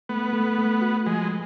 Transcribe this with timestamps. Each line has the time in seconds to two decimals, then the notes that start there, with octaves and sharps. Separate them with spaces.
0.09 A3 B3
0.33 A3
0.58 A3
0.82 F#4
1.06 F3 G#3